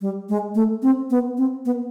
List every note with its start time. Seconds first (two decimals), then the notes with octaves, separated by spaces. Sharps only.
0.01 G3
0.29 G#3
0.55 A3
0.82 C4
1.10 B3
1.37 C4
1.65 B3